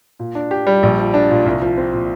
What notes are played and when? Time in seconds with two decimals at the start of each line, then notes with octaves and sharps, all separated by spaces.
0.20 A#2
0.35 D4
0.51 G4
0.67 G3
0.83 A#1
0.99 F3
1.14 D4
1.31 A#2
1.46 C2
1.62 F3
1.78 C4
1.94 A#2